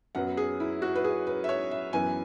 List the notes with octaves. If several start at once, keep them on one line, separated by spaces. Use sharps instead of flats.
F#2 F#3 B3 F#5
G#4
E4
F#4
B4
G#4
B4
E5
C#5
E5
F#2 E3 B3 G#5